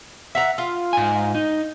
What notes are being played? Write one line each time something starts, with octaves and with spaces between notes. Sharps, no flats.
E5 F#5 A#5
F4
G#2 G#5
D#4